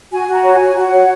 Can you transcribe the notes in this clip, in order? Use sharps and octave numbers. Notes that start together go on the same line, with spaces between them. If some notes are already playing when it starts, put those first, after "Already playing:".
F#4 G#5
F#4 A#5
C#5
G#5
F#4
F#4 F#5
C#5